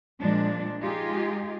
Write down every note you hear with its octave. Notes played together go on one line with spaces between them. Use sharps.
A#2 F3 G#3 D4
G#3 D#4 F4 G4 G#4